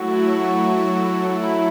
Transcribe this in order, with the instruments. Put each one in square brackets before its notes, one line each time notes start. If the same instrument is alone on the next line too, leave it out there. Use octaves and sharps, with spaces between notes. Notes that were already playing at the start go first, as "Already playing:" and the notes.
Already playing: [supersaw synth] F#3 A3 E4 [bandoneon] F#4
[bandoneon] E4